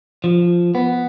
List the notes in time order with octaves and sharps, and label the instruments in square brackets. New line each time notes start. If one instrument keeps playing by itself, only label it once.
[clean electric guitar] F3
B3